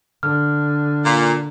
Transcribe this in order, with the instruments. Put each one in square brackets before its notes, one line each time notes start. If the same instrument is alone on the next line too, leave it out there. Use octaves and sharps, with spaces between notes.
[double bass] D3 [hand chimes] F6
[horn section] A#2